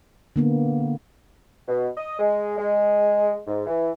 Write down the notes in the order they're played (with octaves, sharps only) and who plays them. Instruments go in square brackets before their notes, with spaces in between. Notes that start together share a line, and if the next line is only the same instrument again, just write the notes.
[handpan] D3 A#3 B3
[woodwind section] B2
D#5
G#3
G#3
G#2
E3